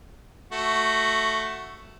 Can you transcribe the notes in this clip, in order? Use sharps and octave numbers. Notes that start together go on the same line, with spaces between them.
A3 F#4